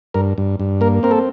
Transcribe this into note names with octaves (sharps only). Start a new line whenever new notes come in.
G2 A#4
G2
G2
A#3 A#4
C4 A#4
A4